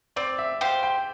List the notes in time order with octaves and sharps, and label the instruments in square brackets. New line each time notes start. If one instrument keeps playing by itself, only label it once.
[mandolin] C4 [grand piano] D5
[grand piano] E5
[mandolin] G4 C5 [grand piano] F5
[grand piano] G5